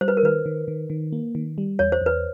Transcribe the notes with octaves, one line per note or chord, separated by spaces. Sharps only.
G3 C5
B4
A#4
D#3 B4
D#3
D#3
D#3
A#3
D#3
G3
E2 C#5
C5
E2 B4